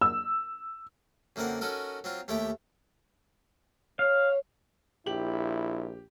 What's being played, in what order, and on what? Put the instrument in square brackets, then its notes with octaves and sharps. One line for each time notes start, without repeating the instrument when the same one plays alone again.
[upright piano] E6
[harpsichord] F#2 D3 A#3 C4 A#4 F#5
C#4 D#4 F#4 A4 A#4
F#3 C4 F4
D#2 A3 E4 G4 G5
[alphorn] C#5 [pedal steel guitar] F5
[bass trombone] A#1 [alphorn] E4 [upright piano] G4 F#7